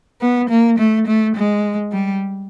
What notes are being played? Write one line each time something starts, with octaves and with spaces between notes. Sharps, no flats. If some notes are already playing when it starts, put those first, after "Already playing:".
B3
A#3
A3
A3
G#3
G3